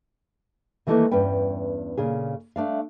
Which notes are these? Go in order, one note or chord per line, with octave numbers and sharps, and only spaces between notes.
D#3 E3 A3 A#3 E4 B4
E2 G2 C#4 B4 G5
A#2 C#3 G#4
A3 D4 F5